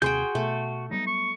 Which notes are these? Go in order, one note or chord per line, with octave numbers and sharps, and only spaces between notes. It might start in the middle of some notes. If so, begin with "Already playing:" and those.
D#2 C3 C4 F#4 G#4 G5 C6 G6
B2 A3
F#3 G3 B3 D#4
C#6